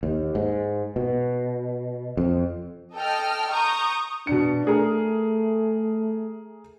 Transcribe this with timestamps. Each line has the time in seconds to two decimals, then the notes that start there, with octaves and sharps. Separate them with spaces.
0.03 D#2
0.35 G#2
0.96 B2
2.17 F2
2.95 A4 D#5 G5 F6
3.51 A#5 C#6 D#6 G6
4.27 B2 D4 C#7
4.67 A3 G#4 A#4